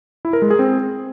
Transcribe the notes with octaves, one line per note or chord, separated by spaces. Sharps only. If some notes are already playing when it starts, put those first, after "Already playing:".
E4
A#4
G#3
G#4
C4